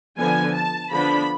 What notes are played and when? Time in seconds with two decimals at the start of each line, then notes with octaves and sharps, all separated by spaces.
0.18 D3 F3 B3 G#5
0.55 A5
0.91 D3 F3 B3 D4 B5